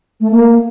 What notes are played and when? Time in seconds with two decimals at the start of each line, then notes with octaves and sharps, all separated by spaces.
0.20 A3
0.30 A#3